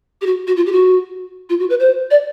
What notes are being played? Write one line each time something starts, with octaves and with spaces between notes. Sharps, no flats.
G4
F#4
F#4
F4
G4
F#4
F4
F#4
B4
C5
D5